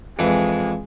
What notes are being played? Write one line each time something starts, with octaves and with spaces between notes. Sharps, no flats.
F2 E3 G#3